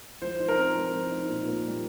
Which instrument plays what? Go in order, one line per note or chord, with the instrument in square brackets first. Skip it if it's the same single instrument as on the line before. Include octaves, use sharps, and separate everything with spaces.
[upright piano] F3 [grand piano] C5
[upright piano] D#4
[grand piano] A#4
[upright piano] C4
F3
F3
D#4
A#2
A#3
G3